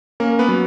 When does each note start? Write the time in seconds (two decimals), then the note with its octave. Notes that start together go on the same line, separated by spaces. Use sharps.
0.20 A#3 C#4 A#4
0.39 B3 B4
0.48 F#3